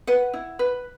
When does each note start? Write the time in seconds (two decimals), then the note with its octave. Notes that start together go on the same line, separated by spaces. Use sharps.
0.07 B4 F#5
0.33 E4
0.59 B4